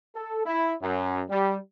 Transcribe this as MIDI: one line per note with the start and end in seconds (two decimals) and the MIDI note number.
0.15 0.42 69
0.46 0.73 64
0.82 1.23 42
1.29 1.57 55